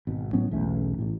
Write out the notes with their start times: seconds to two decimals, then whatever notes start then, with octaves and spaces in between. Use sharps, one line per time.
0.07 G#1 B2
0.33 A2 F#3 B3 C#4
0.51 B1 E2 A3 C#4
0.99 A1 A2